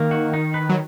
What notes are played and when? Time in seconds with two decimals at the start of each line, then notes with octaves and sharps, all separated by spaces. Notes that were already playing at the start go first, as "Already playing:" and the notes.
Already playing: D#3 A#3
0.11 F#4
0.33 D#4
0.54 B4
0.69 F#3